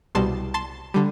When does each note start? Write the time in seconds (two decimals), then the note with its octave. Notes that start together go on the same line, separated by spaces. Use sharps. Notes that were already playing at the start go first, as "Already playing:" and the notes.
0.15 C2 B2 G3 A5 C6
0.54 A5 C6
0.94 D3 G3